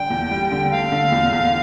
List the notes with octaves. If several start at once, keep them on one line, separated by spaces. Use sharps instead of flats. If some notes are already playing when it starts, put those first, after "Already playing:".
Already playing: D3 G3 D4 G5
E2
G3
D3
A3 F5
D3
E2
E2